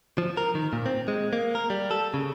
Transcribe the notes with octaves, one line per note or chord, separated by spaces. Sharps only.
F3
A#4
D#3
A#2
C4
G#3
A#3
A#4
G3
A4
C#3